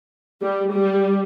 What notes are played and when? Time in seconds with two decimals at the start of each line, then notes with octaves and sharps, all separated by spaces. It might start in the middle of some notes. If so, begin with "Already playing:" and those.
0.42 G3
0.73 G3